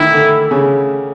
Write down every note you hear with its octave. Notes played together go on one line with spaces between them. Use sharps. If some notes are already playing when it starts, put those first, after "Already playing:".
Already playing: D#3 E3 E4
D3
C#3